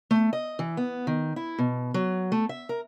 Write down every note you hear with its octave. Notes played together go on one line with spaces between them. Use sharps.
A3
D#5
E3
B3
D#3
E4
B2
F#3
A3
E5
A#4